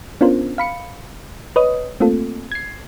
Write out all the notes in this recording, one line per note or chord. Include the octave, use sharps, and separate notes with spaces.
B3 C#4 D4 F4 A#4 C5
F5 B5 C#7
B4 C#5 D#5 D#6
A3 A#3 C4 F4 A4
G#6 C7